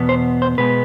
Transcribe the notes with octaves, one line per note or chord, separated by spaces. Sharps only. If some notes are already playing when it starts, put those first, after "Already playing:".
Already playing: E2 B2 B3
C5
C5
B2 G#3 B3 B4